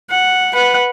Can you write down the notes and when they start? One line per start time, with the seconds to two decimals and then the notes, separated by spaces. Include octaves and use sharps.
0.11 F#5
0.54 B4 F#5